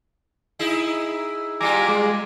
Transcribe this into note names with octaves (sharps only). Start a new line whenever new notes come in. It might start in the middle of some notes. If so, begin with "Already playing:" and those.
D#4 E4 G#4
G3 F4 G4 G#5 A#5 D6
G#3